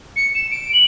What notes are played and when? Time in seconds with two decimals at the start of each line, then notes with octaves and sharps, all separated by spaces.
0.16 C#7
0.34 E7
0.51 D7
0.73 F#7